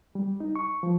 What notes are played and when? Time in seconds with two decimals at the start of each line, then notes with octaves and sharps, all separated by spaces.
0.15 G3
0.40 D#4
0.56 C#6
0.83 F3